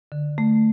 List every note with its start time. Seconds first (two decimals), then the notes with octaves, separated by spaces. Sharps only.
0.12 D3
0.38 A3